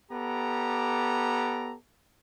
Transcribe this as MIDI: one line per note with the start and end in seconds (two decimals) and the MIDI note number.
0.11 1.73 59
0.11 1.73 67
0.11 1.73 69
0.11 1.73 74
0.11 1.73 82